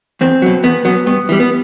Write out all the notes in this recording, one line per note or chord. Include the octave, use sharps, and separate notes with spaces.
E2 C4
B2 F#3
E2 B3
B2 F#3 B3
G2 B3
E3 G3
B3